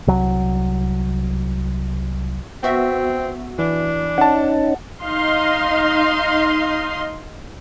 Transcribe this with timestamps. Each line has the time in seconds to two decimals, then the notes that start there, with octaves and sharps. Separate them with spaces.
0.07 C2 F#3
2.63 B3 C4 F#4 E5
3.59 E3 D4
4.18 C#4 D#4 F#5 A5
5.01 D#4 D#5 F5 C6